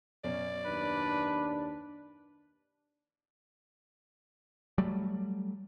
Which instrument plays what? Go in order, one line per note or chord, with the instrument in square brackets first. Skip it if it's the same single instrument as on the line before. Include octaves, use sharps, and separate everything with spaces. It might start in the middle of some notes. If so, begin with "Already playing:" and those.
[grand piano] F#2 B2 C#4 [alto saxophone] D5
[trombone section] D#2 D4 [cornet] B4
[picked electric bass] F#3 G3 A3